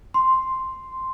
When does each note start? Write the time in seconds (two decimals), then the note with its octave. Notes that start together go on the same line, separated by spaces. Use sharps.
0.14 C6